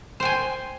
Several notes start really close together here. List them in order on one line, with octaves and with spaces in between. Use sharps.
C5 G5 G#5